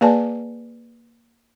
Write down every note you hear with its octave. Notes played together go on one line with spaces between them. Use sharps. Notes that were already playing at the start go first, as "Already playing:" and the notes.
A#3 G#4 B4 D5 G#5 A5